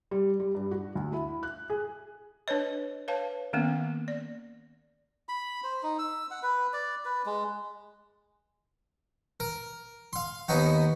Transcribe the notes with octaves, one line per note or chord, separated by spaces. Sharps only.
G3
G3
G2
F#4
D2
E4
F#6
G#4
D4 B4 C#5 D#5
B4 C#5 F5 A5
D#3 A#3 B3 C#4
D5
B5
C5
D#4
E6
F#5
B4
D5
B4
G#3
A#4
F5 C6
D#2 B3 D#4 F#4